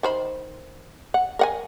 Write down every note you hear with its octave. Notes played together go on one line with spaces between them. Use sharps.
D#3 C5 B5
F#5
A#4 F#5 G#5